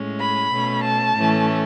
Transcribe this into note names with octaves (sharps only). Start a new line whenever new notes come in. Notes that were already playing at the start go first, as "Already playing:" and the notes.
Already playing: A2 G#3 C#4
B5
B2 A3 C#4
A5
A2 E3 A3 C#4